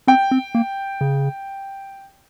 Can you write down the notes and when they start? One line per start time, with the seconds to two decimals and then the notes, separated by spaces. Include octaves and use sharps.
0.07 C4 G5
0.31 C4
0.55 A#3
1.01 C#3